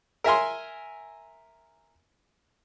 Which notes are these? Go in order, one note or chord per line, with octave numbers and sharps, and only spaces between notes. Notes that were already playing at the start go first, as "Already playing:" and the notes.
A#4 E5 G#5 C6